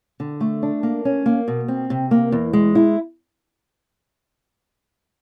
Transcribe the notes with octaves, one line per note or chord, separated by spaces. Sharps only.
D3
A3
D4
A#3
C#4
A#3
B2
C4
C3
A#3
E2
G#3
E4